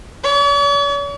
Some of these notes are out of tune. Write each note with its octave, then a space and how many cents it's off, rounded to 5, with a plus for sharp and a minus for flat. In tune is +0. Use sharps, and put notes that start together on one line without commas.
C#5 +45